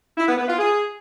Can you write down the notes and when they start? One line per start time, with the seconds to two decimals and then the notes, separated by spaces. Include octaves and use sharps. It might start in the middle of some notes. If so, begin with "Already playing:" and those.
0.18 E4
0.28 B3
0.38 B3
0.48 F4
0.58 G#4